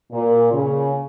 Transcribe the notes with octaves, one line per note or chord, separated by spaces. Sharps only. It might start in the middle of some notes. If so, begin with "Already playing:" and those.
A#2
C#3